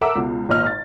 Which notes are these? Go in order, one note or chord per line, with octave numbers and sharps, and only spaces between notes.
A4 A#4 E5 F#5 D6 E6
C#2 B2
G#1 A#2 D#5 F6
A6